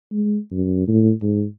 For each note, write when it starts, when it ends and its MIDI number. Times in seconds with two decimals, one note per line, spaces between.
0.12 0.38 56
0.51 0.83 42
0.88 1.11 45
1.22 1.44 44